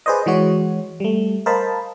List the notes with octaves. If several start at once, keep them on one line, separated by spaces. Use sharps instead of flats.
G#4 B4 C5 D5 D#5
E3 G#3 F#4 C#5
G3 A3
A#4 C5 D#5 F5 A5 B5